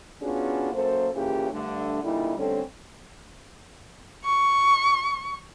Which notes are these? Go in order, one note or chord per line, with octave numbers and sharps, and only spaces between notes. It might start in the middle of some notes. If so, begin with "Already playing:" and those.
B3 C#4 D4 F4 F#4 G#4
F#2 A#3 A4 C5
A#2 C#3 E3 C#4 G4 G#4
G2 D3 A3
A#2 D3 G3 D#4 E4
D3 G3 A3 C4 C#4 A4
C#6